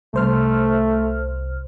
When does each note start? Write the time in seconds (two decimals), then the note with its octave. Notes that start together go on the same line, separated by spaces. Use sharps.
0.14 C2 A3 C5 F6